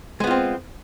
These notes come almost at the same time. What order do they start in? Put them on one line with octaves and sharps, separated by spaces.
G#3 B3 F4 C4